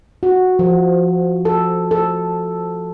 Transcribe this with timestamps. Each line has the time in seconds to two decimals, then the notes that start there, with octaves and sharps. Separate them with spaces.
0.23 F#4
0.59 F3
1.45 A4
1.91 A4